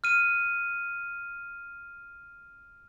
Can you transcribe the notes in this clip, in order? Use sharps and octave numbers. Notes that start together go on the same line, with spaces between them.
F6 D#7